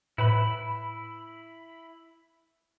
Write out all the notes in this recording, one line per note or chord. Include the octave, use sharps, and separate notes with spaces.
A2 E4 B4 B5